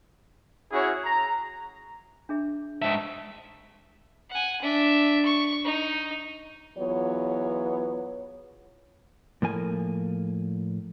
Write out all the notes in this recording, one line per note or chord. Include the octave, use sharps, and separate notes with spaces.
C#4 E4 F#4 G#4 C#5
A#5
D4 G#4 E5
G#2 E5 A5 C#6
F#5 G#5
D4 E5
C#6
D#4
E2 F#3 B3 F4 C#5
A2 F3 A#3 G#5